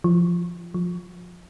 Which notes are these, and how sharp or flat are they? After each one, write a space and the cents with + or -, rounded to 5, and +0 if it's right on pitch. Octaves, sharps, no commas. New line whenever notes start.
F3 -15
F3 +20